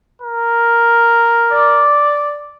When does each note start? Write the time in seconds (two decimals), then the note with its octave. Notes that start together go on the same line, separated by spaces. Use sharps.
0.22 A#4
1.52 D5